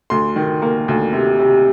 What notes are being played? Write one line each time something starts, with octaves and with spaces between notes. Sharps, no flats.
D2 C6
D#3
A#3
D2
C3
C3